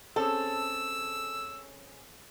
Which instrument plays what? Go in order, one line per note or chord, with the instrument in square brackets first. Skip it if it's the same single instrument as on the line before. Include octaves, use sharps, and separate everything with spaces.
[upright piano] C4 C#4 G#4 [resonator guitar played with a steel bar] A4 [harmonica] E6